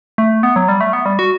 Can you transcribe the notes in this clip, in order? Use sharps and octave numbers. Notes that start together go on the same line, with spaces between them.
A3
B3
F#3
G3
A3
B3
G3
F#4